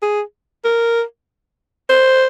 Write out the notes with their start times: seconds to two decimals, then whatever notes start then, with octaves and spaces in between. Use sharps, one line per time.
0.02 G#4
0.65 A#4
1.90 C5